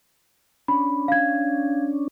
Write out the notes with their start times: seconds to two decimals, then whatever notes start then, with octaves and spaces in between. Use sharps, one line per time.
0.68 C#4 D4 B5
1.08 F5 G#6